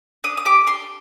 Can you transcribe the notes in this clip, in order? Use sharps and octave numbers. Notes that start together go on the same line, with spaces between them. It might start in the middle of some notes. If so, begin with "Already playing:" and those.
D4 D#6
D#6
G4 D6
D4 C6